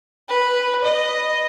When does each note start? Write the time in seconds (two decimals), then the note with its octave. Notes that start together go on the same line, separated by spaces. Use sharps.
0.28 B4
0.84 D#5